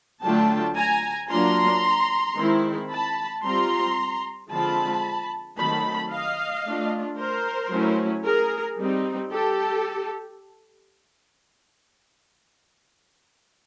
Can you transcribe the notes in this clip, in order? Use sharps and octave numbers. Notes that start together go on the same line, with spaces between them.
D3 F#3 A3 D4 F4 G5 A5
G#5 A#5
F#3 A#3 D4 F4 A#5 C6
D#3 G#3 C4 E4
A5 B5
G3 C4 F4 A#5 C6
D3 F3 G#3 C4 F4 A5 B5
D#3 F#3 A3 C4 A5 B5
D#5 F5
A3 D4 F4
A#4 C5
F#3 A3 C#4 E4
G#4 A#4
G3 C4 D#4
G4 A4